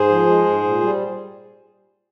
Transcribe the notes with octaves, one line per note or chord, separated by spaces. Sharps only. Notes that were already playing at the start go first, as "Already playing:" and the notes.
Already playing: G#2 G#4 C5
F3
G#3
G#2
A#2
G3